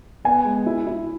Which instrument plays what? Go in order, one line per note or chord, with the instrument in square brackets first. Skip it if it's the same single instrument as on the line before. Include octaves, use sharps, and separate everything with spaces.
[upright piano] B3 [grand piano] G#5
[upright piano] G#3
E4
E4